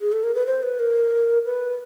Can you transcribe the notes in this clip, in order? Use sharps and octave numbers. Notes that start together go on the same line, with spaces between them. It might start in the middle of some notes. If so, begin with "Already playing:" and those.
G#4
A4
A#4
B4
C5
B4
A#4
B4